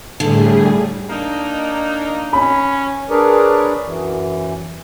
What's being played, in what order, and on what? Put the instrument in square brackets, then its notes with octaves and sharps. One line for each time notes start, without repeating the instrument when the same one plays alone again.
[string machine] A2 G3 G#4 [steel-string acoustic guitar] D3
[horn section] A#3 D4 D#4
[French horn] C#4 [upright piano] B5
[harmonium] D4 G#4 A#4 B4 C#5 D5
F#2 E3